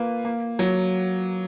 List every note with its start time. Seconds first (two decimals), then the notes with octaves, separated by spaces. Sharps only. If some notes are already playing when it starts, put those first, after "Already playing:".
Already playing: A#3 F4 B4
0.25 A#3
0.59 F#3